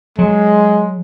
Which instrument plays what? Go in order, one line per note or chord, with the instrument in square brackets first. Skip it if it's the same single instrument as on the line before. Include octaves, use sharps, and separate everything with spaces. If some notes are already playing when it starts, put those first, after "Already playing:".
[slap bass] F#3 [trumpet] G#3